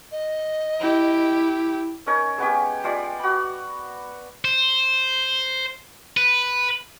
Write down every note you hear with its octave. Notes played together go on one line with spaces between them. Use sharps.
D#5
E4 G4
C#4 D#4 A#4 C#5
G#3 B3 C#4 G4
G#3 F4 G4 D5
F#4 B5
C5
B4